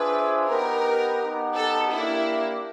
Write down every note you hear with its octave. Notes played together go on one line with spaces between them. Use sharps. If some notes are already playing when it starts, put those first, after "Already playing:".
Already playing: D4 F4 G#4 B4 C5 E5
B3 D#4 G4 A#4 B4
B3 D#4 G4
A4
A#3 D4 E4 G4